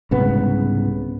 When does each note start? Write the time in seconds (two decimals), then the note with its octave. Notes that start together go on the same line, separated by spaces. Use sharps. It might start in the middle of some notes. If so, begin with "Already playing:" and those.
0.11 C2 G#2 C#3 B3